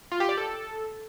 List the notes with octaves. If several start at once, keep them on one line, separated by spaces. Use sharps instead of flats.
F4
G4
D5
A4